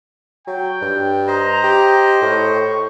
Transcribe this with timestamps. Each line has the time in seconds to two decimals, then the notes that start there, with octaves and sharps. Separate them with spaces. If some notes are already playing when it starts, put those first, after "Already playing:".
0.47 F#3 G5
0.82 G2
1.27 C5 D#5 A#5
1.64 G4
2.22 A2 C#6